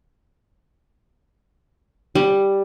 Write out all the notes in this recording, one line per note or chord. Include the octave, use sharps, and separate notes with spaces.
G3